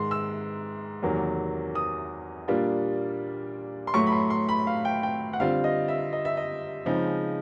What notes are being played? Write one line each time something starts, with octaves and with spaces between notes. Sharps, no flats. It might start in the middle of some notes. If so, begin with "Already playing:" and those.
Already playing: G#2 D#3 G#3 C6
E6
E2 C3 D#3 F#3 A#3
D#6
A#2 G3 A#3 D4 F4
C6
A2 F#3 A3 C#6
B5
C6
C6
B5
F5
G5
G5
F#5
D3 G3 C4 F4 F5
D#5
E5
D#5
E5
D#5
C#3 F3 G#3 C4 D#4